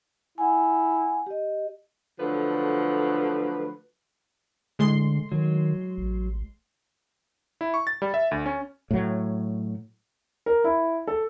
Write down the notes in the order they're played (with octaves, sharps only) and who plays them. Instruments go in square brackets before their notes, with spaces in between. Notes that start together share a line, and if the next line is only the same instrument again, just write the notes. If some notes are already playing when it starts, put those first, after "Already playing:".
[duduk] E4 [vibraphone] F#5 G#5
[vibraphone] G4 D#5
[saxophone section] D3 F3 F#3 A3 B4
[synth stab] A2 G#3 C6 [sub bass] D3
[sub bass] D#3 [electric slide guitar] F#3
[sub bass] A1
[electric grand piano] E4
C#6
A6
G3
E5
D2
C#4
[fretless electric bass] A2 F#3
[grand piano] A#4
E4
A4